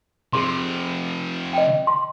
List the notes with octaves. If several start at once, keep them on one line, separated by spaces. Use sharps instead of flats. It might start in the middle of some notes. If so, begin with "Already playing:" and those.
C3 F3 G#4 C6
D#5 G5
C6